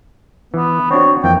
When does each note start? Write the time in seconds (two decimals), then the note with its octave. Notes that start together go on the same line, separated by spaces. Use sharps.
0.54 E3 B3
0.91 C4 D4 F#4 C#5
1.24 F2 E3 A#3 G5